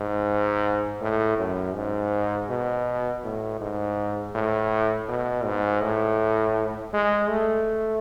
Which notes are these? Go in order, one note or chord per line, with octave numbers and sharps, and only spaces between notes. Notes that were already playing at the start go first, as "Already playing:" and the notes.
Already playing: G#2
A2
F#2
G#2
B2
A2
G#2
A2
B2
G#2
A2
G#3
A3